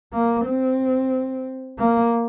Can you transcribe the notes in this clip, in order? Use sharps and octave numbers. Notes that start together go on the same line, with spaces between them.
A#3
C4
A#3